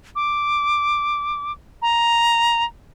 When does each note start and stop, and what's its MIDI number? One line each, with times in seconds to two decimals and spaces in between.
0.16 1.52 86
1.82 2.64 82